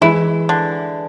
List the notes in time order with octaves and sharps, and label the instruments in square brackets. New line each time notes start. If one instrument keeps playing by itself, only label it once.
[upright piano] E3 G#3 [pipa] E4
[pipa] D3